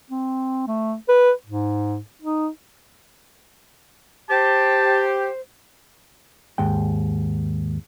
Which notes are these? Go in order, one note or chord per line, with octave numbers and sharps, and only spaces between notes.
C4
A3
B4
G#2
D#4
G4 C5 A5
D#2 G#2 G5